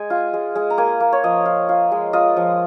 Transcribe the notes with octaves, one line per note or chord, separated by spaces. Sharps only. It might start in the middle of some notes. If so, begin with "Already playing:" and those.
Already playing: G#3 G#5
F4
G#3
G#3
A#5
A#3 G#5
A#3
C#5
F3 D#5
F4
F4
G#3
F4 D#5
F3